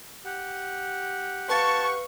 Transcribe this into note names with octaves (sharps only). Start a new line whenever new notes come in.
G4 F#5
B4 F5 A5 C#6